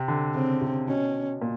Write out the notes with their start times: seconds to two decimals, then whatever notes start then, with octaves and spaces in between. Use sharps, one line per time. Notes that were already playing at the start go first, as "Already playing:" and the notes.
Already playing: C3
0.08 D3
0.35 C#3 C4
0.61 C3
0.88 B2 C#4
1.42 A#2